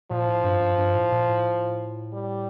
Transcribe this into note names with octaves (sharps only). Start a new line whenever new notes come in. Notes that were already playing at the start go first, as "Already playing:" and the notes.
A#2 F3
A2
G2
G2
G2
A2
A#2
A2
G3